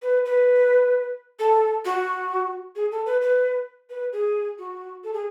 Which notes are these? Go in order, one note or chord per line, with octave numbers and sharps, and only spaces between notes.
B4
B4
A4
F#4
G#4
A4
B4
B4
B4
G#4
F#4
A4
G#4